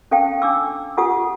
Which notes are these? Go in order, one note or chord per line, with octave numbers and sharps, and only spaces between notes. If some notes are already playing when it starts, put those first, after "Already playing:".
C#4 A4 F5 G5 A5
D4 D6 E6
F4 G4 A4 F#5 A5 D#6